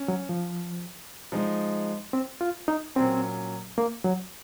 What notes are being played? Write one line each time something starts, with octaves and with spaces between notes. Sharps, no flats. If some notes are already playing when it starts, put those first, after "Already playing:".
Already playing: C#4
F#3
F3
F3 G#3 D#4
C4
F4
D#4
A#2 F#3 C4 C#4
A#3
F#3